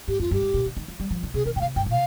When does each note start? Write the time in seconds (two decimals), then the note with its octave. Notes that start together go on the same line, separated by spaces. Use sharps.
0.08 G#2 G4
0.19 F2 F4
0.31 G2 G4
0.42 G#2
0.54 A#2
0.66 D3
0.77 D#3
0.88 F3
1.00 G3
1.11 F3
1.23 D3
1.34 C3 G#4
1.46 D#3 A#4
1.56 A#2 G5
1.61 C3 F5
1.76 G2 G5
1.86 A#2
1.91 C3 F5